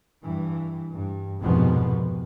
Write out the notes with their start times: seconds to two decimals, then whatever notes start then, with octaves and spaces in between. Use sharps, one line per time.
0.24 G2 E3
0.92 G2
1.41 C2 F2 G#2 B2 F3 B3